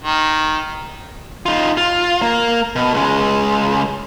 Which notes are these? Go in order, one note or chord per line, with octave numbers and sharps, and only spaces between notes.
D#3
D#4 F4
F4
A#3
B2
C#2 G#3